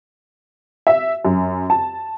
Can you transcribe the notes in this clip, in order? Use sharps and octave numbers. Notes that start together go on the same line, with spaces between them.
E5
F#2
A5